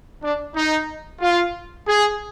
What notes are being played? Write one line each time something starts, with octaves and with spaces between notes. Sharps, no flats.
D4
D#4
F4
G#4